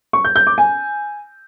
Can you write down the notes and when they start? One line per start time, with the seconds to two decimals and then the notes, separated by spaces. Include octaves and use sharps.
0.13 C#6
0.24 G6
0.36 G6
0.47 D6
0.58 G#5